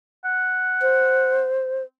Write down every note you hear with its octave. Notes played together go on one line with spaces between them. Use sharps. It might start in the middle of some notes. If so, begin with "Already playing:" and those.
F#5
C5